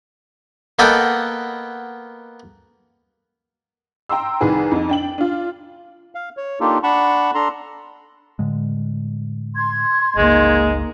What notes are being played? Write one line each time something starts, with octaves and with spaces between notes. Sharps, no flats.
A#3 B3 A4 D#5 F#5 G5
G5 A#5 C6 E6
C2 D#3 G#4 B4
F2 D#4
D4 G5 F#7
D4 F4
F5
C#5
A#3 D4 D#4 F4 G4 A4
D4 F#5 A5 B5 C#6
D4 A4 A#5 C6
A2 D3 G#3
C6 G#6
G1 C#2 G#3 A#3 D#4